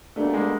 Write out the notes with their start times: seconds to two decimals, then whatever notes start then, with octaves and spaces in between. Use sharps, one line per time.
0.16 B2 G3 A3 A#3 D4
0.34 G#3